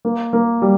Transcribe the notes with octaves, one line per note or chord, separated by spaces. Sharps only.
A#3
A#3
G3